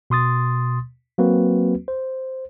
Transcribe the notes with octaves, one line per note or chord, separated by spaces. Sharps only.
B2 C6 D#6 A6
F#3 A#3 C4 F#4 B4
C5